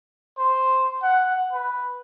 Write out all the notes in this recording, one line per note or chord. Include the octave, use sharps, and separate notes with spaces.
C5
F#5
B4